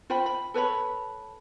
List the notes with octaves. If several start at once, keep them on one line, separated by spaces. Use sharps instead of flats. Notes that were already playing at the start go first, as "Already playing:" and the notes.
F4 C5 G5 B5
B5
A4 B4 C#5 B5